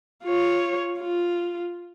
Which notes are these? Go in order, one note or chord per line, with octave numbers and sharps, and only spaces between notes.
F4 C#5
F4